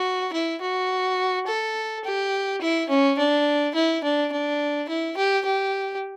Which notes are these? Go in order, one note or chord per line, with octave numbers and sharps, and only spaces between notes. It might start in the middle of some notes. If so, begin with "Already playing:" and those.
Already playing: F#4
E4
F#4
A4
G4
E4
C#4
D4
E4
D4
D4
E4
G4
G4